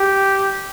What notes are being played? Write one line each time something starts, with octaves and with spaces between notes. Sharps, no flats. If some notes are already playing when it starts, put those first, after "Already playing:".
Already playing: G4